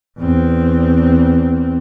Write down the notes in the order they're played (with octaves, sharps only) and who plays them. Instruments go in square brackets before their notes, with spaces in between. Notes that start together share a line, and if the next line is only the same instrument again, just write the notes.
[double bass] E2 C4